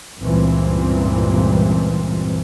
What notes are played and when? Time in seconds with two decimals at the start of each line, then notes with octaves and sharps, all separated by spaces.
0.21 C#2 G2 A#2 E3 C4